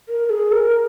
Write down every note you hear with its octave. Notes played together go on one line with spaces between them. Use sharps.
A#4
A#4
G#4
A#4